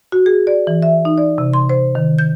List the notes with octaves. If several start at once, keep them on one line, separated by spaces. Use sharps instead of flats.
F#4
G#4
D5
E3
E5
D#4
D5
C3
C6
C5
D#3
G6